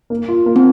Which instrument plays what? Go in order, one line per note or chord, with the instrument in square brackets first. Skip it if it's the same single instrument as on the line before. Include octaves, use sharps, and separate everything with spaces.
[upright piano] A#3
F4
A#3
[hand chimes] C4